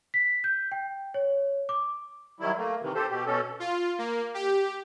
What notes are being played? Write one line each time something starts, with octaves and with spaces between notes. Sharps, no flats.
B6
G6
G5
C#5
D6
D#3 F#3 G3 E4
A3 A#3
C3 D#3 E3
G4 A4 C5
B2 G4
B2 C#4 A4
F4
A#3
G4